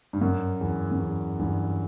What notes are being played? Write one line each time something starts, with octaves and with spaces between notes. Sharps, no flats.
G2
F#2
E2
F#2
E2
E2 G2